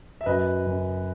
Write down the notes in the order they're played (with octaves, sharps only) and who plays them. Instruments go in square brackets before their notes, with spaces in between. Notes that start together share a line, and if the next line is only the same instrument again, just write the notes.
[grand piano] E5
F#2 F#3 B4 D#5
F#2 F#3